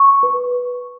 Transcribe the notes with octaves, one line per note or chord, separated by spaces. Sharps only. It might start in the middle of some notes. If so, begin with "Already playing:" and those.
Already playing: C#6
B4